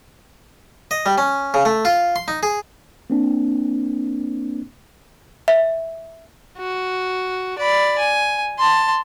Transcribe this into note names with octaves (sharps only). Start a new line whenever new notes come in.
D#5
G3
C#4
C#3
A3
F4
C6
D#4
G#4
A#3 C4 D4
E5
F#4
D5 B5
G#5
A5 C6